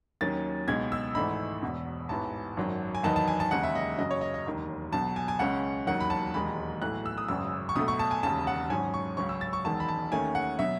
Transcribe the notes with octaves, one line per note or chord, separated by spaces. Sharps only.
D#2 D#3 F#3 C#4 A6
C#2 B2 G#3 D#4 G#6
E6
G#1 G#2 E3 A3 D#4 B5
E1 E2 B2
A1 G#2 E3 B3 A5
G#1 F#2 D#3 F#3
G#5
E2 D#3 F#3 B3 D#4 A5
A5
G#5
A5
E1 D#2 C#3 G#3 F#5
E5
D#5
F#2 C#3 F#3 D#5
C#5
D#5
D#5
E1 D#2 D#3
B1 B2 F#3 A5
G#5
G#5
C#2 C#3 G#3 C#4 F#5
E1 D#2 D#3 F#3 F#5
B5
A5
E1 D#2 D#3 G#3 D#4 B5
B1 A2 E3 A3 F#6
E6
D#6
G#1 F#2 C#3 E6
C#6
B1 B2 A3 D#6
C#6
A5
G#5
E1 D#2 C#3 A5
F#5
G#1 G#2 F#3 C#4 G#5
C#6
C#2 C#3 F#3 C#4 C#6
E6
A6
C#6
E1 E2 D#3 G#3 A5
B5
A5
D#2 D#3 A3 C#4 G#5
F#5
B2 F#3 E5